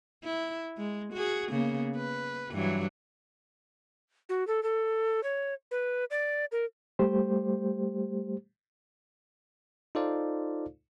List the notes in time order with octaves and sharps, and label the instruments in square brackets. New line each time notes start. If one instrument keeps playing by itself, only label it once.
[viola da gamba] E4
G#3
F#4 G#4
C#3 A#3 B3
B4
G2 E3 F#3
[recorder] F#4
A4
A4
C#5
B4
D5
A#4
[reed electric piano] G3 A3 G4 C5
[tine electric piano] D#4 F4 A4 C5 D5 F5